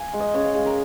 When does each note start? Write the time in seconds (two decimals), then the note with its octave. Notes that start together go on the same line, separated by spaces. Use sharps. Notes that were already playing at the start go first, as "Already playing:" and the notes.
Already playing: F5 G#5
0.13 G#3
0.20 D#5
0.34 C#3 C#5
0.44 F5
0.55 G#3 F5
0.66 A#4